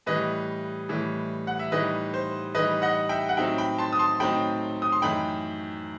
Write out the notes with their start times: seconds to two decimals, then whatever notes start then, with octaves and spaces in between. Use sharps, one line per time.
0.06 A2 E3 G3 B4 D#5
0.89 A2 E3 G3
1.47 F#5
1.59 E5
1.72 A2 E3 G3 D#4 B4 D#5
2.14 C5
2.55 A2 E3 G3 D#4 B4 D#5
2.82 D#5 F#5
3.09 E5 G5
3.29 F#5
3.37 A2 F#3 C4 D#4 E5 G5
3.58 G5 B5
3.78 A5 C6
3.92 D#6
3.99 A5 C6
4.20 A2 F#3 C4 D#4 G5 B5
4.82 D#6
4.92 C6
5.02 F#2 E3 A3 D#4 G5 B5